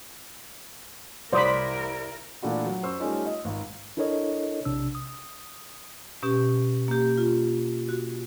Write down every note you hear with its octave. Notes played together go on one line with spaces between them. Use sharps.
C2 E4 A#4 C5 D5 B5 D#6
A#2 E3 A3 D4 E4 F#4
F#3
F#2 C5 C#6 E6
G3 A3 C#4 D#4 F4
D#5
G#1
D4 E4 A4 A#4 C#5 D#5
A#1 C3 D4 E6
D#6
B2 C#4 G4
A#3 G4
F4
F#4